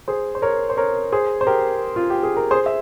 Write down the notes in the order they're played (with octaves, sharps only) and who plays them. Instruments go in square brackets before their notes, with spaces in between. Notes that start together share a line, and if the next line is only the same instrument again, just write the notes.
[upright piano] G#4 C5
C5
A#4 C#5
C5
A#4 C#5
G#4 C5
C5
G4 A#4
F4
G4
G#4
A#4
G#4 C5
E5